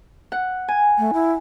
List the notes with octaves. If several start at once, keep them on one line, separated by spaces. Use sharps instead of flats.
F#5
G#5
A3
E4